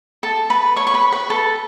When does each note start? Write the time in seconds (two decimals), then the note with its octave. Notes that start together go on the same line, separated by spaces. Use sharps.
0.23 A4 A5
0.50 B4 B5
0.76 C#5 C#6
0.87 C#6
0.94 B4 B5
1.12 B4 B5
1.30 A4 A5